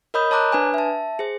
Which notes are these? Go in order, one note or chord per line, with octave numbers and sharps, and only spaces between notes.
A#4 C#5 D#5 B5 D#6 G6
C#5 A5 A#5 D6 F#6
D4 B4 G#5
E5 A5
G#4 C5